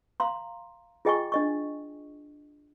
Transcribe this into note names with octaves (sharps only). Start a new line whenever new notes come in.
F5 A#5 C6
F4 G#4 D#5 G5 G#5 C#6
D4 D#5 C#6